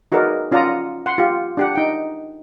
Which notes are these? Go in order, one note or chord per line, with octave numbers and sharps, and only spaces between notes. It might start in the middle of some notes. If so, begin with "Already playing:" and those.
D#4 F#4 G#4 A#4 B4 D5
C#4 F4 D5 F#5 A#5 D#6
F#5 C6
F4 G4
D4 G4 F#5
D#4 G5